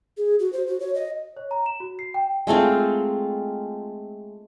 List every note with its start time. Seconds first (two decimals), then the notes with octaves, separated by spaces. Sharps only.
0.17 G#4
0.39 F#4
0.53 C5
0.68 F#4
0.80 C#5
0.95 D#5
1.37 C#5
1.51 A#5
1.66 E7
1.80 F#4
1.99 C7
2.14 G5
2.47 G#3 A3 C4 F4